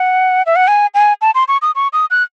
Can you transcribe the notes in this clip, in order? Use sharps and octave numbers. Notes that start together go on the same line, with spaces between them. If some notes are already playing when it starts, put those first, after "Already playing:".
Already playing: F#5
E5
F#5
G#5
G#5
A5
C6
C#6
D#6
C#6
D#6
F#6